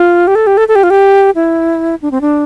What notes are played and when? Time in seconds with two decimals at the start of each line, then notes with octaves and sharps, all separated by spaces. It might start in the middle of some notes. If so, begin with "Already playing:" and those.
Already playing: F4
0.27 G4
0.35 A4
0.47 G4
0.57 A4
0.68 A4
0.75 G4
0.83 F4
0.90 G4
1.35 E4
2.02 D4
2.11 C4
2.21 D4